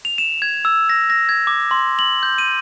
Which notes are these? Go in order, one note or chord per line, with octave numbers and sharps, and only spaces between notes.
F7
E7
G#6
E6
A#6
A#6
G#6
D6
C6
F#7
G6
D#7